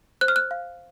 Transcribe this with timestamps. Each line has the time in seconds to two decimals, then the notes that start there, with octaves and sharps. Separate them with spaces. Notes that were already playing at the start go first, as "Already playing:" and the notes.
0.21 C5 F#6
0.28 F6
0.36 F#6
0.51 F5